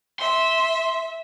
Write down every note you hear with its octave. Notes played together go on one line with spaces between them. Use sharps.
E5 C6